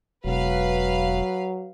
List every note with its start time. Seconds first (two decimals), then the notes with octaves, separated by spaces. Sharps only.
0.25 E1 F#3 B4 F5